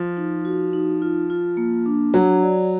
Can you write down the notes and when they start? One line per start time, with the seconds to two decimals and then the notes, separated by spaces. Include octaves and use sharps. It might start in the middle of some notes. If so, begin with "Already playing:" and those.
Already playing: F3
0.17 D#4
0.45 F#4
0.73 D#4
1.02 F4
1.30 F4
1.57 A#3
1.86 D4
2.14 F#3 F#5
2.43 D5